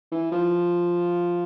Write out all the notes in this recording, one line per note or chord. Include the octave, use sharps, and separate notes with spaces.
E3
F3